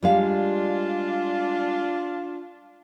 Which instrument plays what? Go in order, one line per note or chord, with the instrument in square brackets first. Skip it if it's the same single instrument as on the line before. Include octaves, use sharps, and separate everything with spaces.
[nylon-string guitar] G3 G#3 F5 [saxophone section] D4 F4